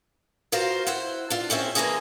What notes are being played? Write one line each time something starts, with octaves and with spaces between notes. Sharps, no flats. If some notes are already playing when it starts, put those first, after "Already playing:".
F4 F#4 A#4 C5 F5
E4 C5 F#5
D4 F4
G#3 C4 C#4 E5
D3 E3 G#3 A#3 C#4 G#4